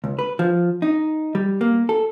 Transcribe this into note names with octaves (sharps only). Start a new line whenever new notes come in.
C#2
B4
F3
D#4
G3
A#3
A4